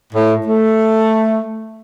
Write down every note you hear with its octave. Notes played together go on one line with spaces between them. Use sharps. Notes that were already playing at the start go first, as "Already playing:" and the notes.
A2
A3